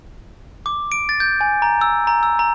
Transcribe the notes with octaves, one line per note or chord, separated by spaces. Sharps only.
D6
D7
A6
G6
G#5
A#5
E6
A#5
E6
A#5